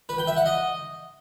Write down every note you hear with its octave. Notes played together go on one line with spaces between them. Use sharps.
B4
G5
E5
F#5
D#5